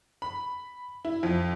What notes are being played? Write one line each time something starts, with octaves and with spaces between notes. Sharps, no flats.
B5
E4
F2